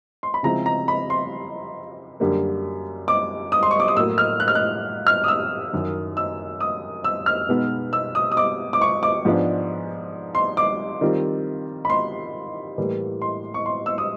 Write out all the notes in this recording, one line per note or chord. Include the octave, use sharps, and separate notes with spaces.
C6
B5
C#3 F3 G#3 C4 E4 A#5
A#5
B5
C6
F#2 D3 G3 A#3
D6
D#6
C6
C#6
D6
D#6
A2 F#3 A#3 E6
F6
F#6
F6
F#6
F6
D#6
E6
F#2 D#3 F#3
E6
D#6
E6
F6
B2 G#3 B3 D#4
E6
D#6
D#6
D6
D6
C#6
D6
G#2 F3 G#3 B3 D4
C6
D6
D#3 G3 C4 F4
B5
C6
A2 E3 G3 A#3
C6
C#6
C6
E6
D#6